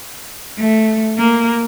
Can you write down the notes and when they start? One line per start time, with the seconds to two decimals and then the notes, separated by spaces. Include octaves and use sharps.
0.59 A3
1.18 A#3